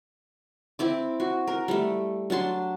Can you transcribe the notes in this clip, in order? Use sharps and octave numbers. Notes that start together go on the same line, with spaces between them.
C4 E4 D6
F#4
A#4
G3 A3
F#3 D4 A5 C6